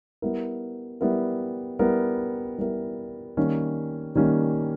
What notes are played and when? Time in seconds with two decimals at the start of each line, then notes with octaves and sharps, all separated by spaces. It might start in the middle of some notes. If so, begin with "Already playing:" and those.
0.22 G3 B3 E4 A#4
1.01 G3 B3 E4 A#4
1.79 G3 B3 E4 A#4
2.58 G3 B3 E4 A#4
3.37 D#3 G3 A#3 C#4
4.15 D#3 G3 A#3 C#4